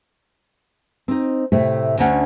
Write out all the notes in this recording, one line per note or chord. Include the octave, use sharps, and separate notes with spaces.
C4 D#4
A2 C3 A3
D2 D3 C#4 F#5